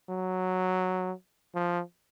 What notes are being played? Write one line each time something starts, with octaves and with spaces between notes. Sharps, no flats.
F#3
F3